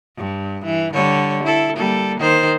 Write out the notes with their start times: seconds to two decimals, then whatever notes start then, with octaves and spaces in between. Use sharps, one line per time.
0.17 G2
0.65 E3
0.93 D3 G3 C#5
1.43 E4 A4
1.76 G3 A#3 A4
2.20 D#3 C5